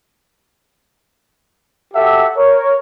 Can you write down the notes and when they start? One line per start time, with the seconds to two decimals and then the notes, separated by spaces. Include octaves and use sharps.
1.94 F#4 G4 A4 E5 F#5
2.36 A#4 C#5